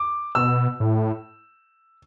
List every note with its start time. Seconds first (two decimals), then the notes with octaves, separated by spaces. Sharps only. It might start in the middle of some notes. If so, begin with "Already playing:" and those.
Already playing: D6
0.35 B2 E6
0.80 A2